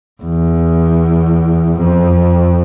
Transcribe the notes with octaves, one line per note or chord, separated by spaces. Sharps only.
E2
F2